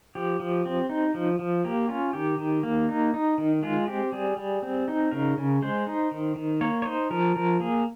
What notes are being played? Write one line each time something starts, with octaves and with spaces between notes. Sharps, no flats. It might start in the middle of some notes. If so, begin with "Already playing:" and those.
F3 G4
F3
C4
D#4
F3
F3
A#3 G4
C#4 F4
D#3 G4
D#3
A#3
D#4
D#4
D#3
G#3 F4
C4 G4
G3 G#4
G3
C4
D#4
C#3 A#4
C#3
G#3 C5
D#4
D#3
D#3
A#3 C#5
C#5
D#4 C5
F3 A#4
F3 A#4
A#3 G#4